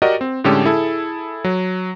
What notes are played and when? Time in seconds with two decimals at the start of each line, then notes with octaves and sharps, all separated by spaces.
0.02 F#4 G4 A#4 D5 D#5 F#5
0.21 C4
0.44 A2 D3 G#3 C#4 G4 A4
0.66 E4 G#4 A4
1.44 F#3